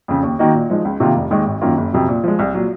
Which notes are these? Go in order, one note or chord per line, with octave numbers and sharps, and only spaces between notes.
F2 C#3
D#2
D#3 A#3 D#4 F#4
A#2
F3 G#3 D#4
C#2
C3 D#3 A#3 F4
F1
D#2 D#3 G#3 D#4
G#1
F#2 D#3 A#3 F4
F#1
F2 C3 F#3
A#2
F3 G#3
C2
A#2 F#3